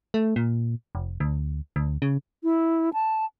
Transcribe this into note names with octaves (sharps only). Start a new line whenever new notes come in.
A3
A#2
F1
D2
D2
C#3
E4
A5